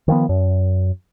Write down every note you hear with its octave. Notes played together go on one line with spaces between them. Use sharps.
D#3 F3 B3
F#2